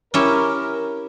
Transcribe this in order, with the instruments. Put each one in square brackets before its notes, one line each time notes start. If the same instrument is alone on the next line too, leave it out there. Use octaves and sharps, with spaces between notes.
[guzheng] C#4 E4 G4 [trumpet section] A#4